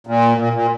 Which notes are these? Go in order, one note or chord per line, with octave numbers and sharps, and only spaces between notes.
A#2
A#2
A#2